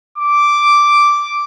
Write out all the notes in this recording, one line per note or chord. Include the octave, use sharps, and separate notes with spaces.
D6